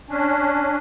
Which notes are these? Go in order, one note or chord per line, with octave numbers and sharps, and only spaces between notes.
C#4 D4